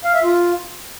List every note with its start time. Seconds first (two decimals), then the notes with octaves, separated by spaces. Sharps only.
0.05 F5
0.14 E5
0.23 F4